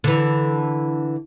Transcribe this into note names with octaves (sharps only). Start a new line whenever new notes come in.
D3 E3